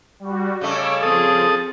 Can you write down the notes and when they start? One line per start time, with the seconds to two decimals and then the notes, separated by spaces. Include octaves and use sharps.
0.20 G3 F#4
0.61 C#3 G3 A3 C#5 D#5 D6 E6
1.03 F3 C4 G#4 A4 D#6